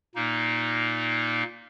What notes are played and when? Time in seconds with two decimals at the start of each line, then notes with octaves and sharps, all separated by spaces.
0.15 A#2 A#3 D#4